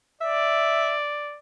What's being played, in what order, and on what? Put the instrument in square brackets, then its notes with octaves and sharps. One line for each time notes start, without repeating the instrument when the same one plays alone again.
[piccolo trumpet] D5 [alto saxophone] E5